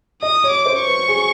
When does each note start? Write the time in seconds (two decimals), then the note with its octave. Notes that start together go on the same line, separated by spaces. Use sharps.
0.22 D#5 D#6
0.44 C#5
0.51 D6
0.66 C5
0.80 C#6
0.87 B4
1.08 G#4